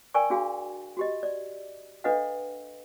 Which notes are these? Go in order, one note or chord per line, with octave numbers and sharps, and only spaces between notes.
A#4 D5 G5 G#5 C#6
D4 F#4 G#4 F5
F#4 G4 D#5
D5
D4 A4 B4 D#5 F5 F#5